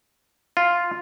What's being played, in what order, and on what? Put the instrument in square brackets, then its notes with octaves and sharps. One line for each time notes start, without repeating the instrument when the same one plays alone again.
[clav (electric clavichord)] F4